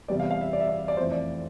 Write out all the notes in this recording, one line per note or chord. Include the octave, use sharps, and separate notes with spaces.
E2 C3 G3 B3 D5
F5
F5
E5
D5
E5
D5
D5
F1 F2 E3 A3 C5
D5